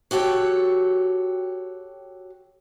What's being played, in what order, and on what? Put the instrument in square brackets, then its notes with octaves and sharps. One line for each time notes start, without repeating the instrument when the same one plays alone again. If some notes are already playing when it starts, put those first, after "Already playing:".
[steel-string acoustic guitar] F#4 G4 A4 C#5 G5